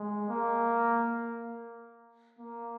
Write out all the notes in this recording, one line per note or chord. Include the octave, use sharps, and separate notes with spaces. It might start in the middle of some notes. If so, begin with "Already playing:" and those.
Already playing: G#3
A#3
A#3